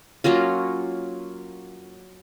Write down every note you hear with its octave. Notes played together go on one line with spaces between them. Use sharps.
F#3 A#3 C#4 F4